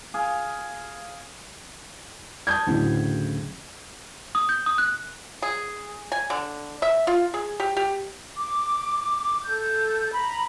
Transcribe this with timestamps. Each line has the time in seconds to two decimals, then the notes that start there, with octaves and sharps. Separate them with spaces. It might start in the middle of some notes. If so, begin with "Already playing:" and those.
0.14 G#4 F5
2.47 A5 D#6 G6 G#6
2.67 D2 A2 C#3 F#3
4.35 D#6
4.49 G6
4.66 D#6
4.78 F#6
5.42 G#4
6.12 G#5
6.30 D3
6.82 E5
7.07 F4
7.34 G#4
7.60 G4
7.77 G4
8.37 D6
9.43 A4 G6
10.12 A#5 B5